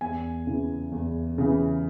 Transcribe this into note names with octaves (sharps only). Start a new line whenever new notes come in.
E2 G#5
C#3 E3
E2
C#3 E3